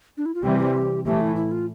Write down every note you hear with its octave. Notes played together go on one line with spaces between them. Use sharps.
D4
E4
F4
C3 E3 G3 C4 G4
G4
A2 E3 A3 G4
E4
E4
F4